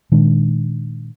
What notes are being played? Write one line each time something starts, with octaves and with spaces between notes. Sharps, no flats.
A#2 D#3 G#3 D4